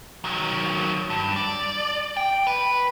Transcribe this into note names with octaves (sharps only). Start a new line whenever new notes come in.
D#3 F#3
G2
D5
G5
B4